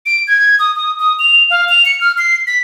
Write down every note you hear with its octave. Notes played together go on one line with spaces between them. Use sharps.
D7
G#6
D#6
D#6
D#6
F7
F5
F7
C#7
F6
C7
B6